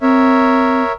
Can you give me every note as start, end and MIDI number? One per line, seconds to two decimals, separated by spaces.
0.01 0.83 60
0.01 0.92 70
0.01 0.92 73
0.01 0.92 76